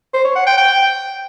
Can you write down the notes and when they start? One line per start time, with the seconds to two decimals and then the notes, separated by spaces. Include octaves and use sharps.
0.14 C5
0.25 C#5
0.36 F#5
0.47 G5
0.57 G5